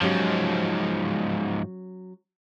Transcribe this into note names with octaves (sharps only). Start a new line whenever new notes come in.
G#2 F3 F#3 C#4 G4